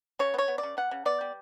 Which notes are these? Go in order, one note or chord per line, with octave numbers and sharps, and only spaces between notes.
C#3 C#5
B3
C#5
B3
D5
C#3
B3 F#5
C#3
B3 D5
G3